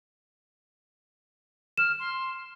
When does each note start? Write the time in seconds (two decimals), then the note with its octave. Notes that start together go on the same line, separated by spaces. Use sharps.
1.78 F6 E7
1.99 C6